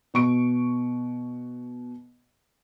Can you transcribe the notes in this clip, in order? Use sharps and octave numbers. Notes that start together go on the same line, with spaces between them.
B2 C#6 D7